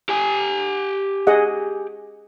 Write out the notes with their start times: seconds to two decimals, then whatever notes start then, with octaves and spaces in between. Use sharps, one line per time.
0.09 G4 G#5
1.27 G#4 D#5 F#5